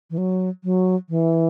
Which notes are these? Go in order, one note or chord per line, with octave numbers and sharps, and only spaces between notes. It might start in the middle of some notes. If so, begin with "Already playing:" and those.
E3
F#3
F#3
E3